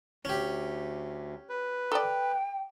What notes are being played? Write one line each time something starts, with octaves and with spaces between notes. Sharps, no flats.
D2 C#4 G4
B4
A4 D5 G5